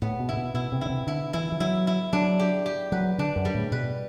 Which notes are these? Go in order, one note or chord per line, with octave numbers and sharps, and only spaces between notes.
A2 B3
B2
C3 E4
B2
B2 E4
C3
D3 E4
C3
D3 E4
E3 E4
E3
F#3 E4
E4
F#3 D4
G4
G4
F#3 B4
D3 D4
F#2
G3
A2
B2 B4